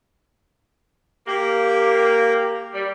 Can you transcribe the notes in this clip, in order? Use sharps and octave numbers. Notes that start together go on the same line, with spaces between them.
A#3 G4
G3